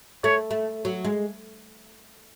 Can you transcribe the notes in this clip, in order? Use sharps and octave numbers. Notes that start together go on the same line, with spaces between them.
A3 C#5
A3
F#3
G#3